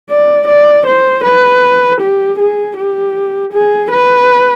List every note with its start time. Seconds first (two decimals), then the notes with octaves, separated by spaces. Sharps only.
0.10 D5
0.48 D5
0.87 C5
1.24 B4
2.01 G4
2.39 G#4
2.77 G4
3.53 G#4
3.91 B4